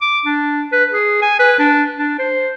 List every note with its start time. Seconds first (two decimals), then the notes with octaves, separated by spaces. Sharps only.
0.02 D6
0.26 D4
0.72 B4
0.91 G#4
1.22 G#5
1.40 B4
1.59 D4
1.98 D4
2.19 C5